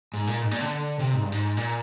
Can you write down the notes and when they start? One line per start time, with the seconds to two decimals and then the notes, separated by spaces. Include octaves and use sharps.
0.13 G#2
0.27 A#2
0.42 G#2
0.51 A#2
0.61 D3
0.99 C3
1.14 G#2
1.23 G2
1.32 G#2
1.57 A#2